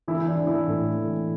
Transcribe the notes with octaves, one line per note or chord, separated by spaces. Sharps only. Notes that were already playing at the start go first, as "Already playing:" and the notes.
E3 E4
D4
E3
E4
A2
E3